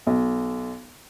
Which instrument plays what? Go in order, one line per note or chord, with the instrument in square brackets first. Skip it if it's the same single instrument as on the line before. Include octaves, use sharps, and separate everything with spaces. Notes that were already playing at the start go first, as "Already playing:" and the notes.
[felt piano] B1